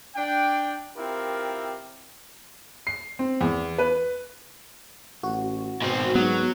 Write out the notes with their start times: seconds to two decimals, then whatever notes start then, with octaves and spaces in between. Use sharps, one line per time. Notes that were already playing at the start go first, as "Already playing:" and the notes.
0.15 D4 G5
0.96 C4 E4 F4 G4 A#4
2.87 C7
3.19 C4
3.41 E2
3.78 B4
5.23 A1 F#4
5.82 G#2 B2 C4
6.15 G#2 F#3 B3